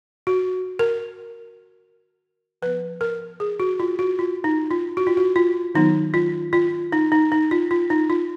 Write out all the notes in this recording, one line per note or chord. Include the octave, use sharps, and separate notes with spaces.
F#4
A#4
F3 B3 B4
A#4
G#4
F#4
F4
F#4
F4
D#4
F4
F#4
F4
F#4
F4
D#3 F#3 B3 D#4
F4
F4
D#4
D#4
D#4
F4
F4
D#4
F4